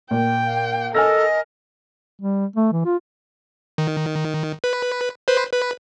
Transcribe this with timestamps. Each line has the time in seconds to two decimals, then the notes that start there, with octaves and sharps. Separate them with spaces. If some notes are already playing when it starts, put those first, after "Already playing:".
0.11 A#2 G5
0.46 F5
0.94 A4 A#4 D#5 G#5 F6 A#6
2.21 G3
2.56 A3
2.72 E3
2.85 F4
3.78 D#3
4.64 B4
5.28 B4 C5
5.52 B4